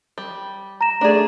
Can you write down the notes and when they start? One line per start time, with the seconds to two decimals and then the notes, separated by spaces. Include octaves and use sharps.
0.18 G3
0.81 A#5 A#6 E7
1.01 A3 D4 G#4 D5